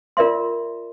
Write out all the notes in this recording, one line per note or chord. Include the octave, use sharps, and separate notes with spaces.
F4 A#4 D5 E5 C6